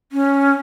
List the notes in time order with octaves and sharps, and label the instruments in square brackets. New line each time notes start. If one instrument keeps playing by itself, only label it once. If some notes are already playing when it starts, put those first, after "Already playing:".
[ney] C#4